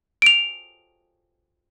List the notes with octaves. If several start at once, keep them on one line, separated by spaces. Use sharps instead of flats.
D7 F7